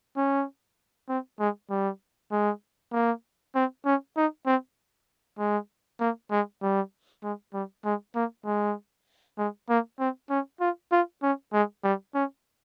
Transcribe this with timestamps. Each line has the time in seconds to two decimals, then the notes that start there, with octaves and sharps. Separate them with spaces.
0.17 C#4
1.09 C4
1.39 G#3
1.70 G3
2.31 G#3
2.92 A#3
3.55 C4
3.85 C#4
4.16 D#4
4.46 C4
5.39 G#3
6.00 A#3
6.31 G#3
6.62 G3
7.23 G#3
7.53 G3
7.85 G#3
8.15 A#3
8.46 G#3
9.38 G#3
9.69 A#3
9.99 C4
10.30 C#4
10.60 F4
10.92 F4
11.22 C#4
11.53 G#3
11.84 G3
12.14 C#4